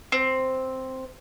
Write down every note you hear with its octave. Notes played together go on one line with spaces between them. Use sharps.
C4